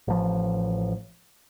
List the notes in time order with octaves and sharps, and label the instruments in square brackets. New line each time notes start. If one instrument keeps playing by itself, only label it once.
[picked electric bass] A1 F3